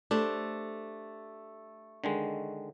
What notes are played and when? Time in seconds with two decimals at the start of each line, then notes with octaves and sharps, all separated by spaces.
0.11 A3 D4 G4 C5
2.04 D3 D#3 G#3